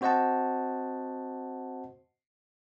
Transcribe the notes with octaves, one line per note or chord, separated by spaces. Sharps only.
C4 F#4 C5 D#5 F#5 A5